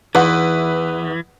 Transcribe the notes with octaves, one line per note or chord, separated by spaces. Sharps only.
E2 E3 D#4 F4 F#4 B4